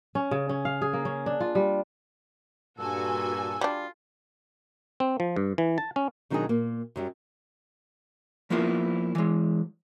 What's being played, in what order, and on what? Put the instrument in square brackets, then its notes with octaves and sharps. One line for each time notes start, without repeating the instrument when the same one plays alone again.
[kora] C#4
C#3
C#4
F5
G#4
A#3
C#4
D4
F4
G3
[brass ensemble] G2 A#2 [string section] F#4 A4 G#5 [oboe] E6
[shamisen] G3 D4 [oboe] F4
[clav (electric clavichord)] C4
F3
G2
E3
A5
C#4
[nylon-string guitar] B2 D#3 F#3 D4 D#4 G#4
A#2 A#3
F#2 F#3 G3
[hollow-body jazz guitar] F3 A#3 B3 E4 F4 A#4
E3 G#3